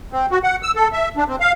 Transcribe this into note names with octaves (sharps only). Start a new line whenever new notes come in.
C4
F#4
F#5
E6
A4
E5
D4
C4
F5